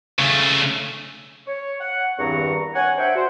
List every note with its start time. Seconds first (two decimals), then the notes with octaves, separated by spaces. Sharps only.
0.19 C#3 A3
1.48 C#5
1.81 F#5
2.19 E2 G2 D#3 C4 A#5 C#6
2.75 C#5 F#5 G#5
2.98 D4 C5 E5 F#5 G5
3.16 F#4 C5